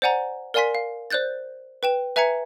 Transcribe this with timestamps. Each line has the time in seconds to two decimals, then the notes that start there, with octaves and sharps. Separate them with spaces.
0.02 C5 D5 F#5 G#5 A#5
0.54 A#4 D5 F5 G#5 C6 B6
0.75 F5
1.10 C5 D5 F#6 G6 A6
1.83 B4 G5 E7
2.16 B4 E5 G#5 A#5 G#6 C#7